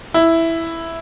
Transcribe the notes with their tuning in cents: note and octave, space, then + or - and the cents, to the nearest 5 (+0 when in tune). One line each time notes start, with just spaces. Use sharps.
E4 +0